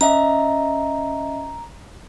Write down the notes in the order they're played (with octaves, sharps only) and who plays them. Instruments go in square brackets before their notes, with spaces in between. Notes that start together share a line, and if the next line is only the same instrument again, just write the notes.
[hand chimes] C#4 D#5 E5 [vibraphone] A#5